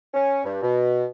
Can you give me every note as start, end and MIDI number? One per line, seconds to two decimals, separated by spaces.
0.14 0.42 61
0.44 0.59 43
0.62 1.06 47